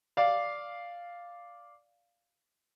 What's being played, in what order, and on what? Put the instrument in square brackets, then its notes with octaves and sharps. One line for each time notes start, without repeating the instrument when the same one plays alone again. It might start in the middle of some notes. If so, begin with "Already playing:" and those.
[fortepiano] D5 F5